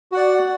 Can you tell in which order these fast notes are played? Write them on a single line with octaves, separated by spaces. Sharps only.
F#4 F#5 D5